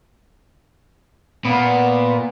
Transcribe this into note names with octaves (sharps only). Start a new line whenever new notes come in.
A#2 B3